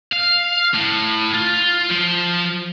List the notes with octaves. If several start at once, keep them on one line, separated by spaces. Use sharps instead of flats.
F5
A2
F4
F3